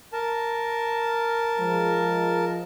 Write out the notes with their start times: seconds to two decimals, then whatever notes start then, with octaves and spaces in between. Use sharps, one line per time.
0.13 A#4 A5
1.58 F3 G#3